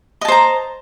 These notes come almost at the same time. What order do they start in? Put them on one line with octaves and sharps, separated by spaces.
D#5 A5 C5 A#5